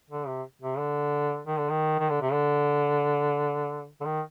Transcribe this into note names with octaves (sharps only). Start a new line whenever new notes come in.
D3
C3
C3
D3
D#3
D3
D#3
D#3
D3
C3
D3
D3
D#3